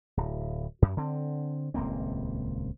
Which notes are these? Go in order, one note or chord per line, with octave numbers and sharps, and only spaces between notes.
D1
F#2
D3 C4
D#1 C#2 A#3 C4